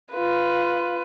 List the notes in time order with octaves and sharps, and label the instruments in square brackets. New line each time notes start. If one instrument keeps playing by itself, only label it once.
[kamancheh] F4 B4